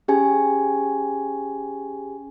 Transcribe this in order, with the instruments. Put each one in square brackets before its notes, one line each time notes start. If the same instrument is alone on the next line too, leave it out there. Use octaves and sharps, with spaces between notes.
[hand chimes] C#4 G4 G#4 G#5